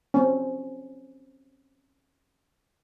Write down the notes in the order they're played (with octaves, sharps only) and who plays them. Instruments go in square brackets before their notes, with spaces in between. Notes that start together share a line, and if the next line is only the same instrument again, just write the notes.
[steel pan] C4 C#4